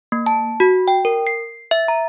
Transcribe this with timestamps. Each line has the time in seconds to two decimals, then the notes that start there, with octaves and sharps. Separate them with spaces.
0.12 A#3
0.26 A5
0.60 F#4
0.88 G5
1.05 A#4
1.27 C7
1.71 E5
1.88 A#5